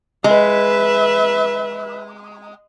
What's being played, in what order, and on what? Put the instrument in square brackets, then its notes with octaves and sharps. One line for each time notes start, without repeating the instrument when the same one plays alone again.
[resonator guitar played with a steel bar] G#3 [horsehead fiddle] B4 E5